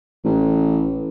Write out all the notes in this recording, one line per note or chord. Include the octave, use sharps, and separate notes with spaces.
A1